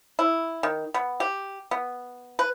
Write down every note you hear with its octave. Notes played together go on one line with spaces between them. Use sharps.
E4
D#3
B3
G4
B3
B4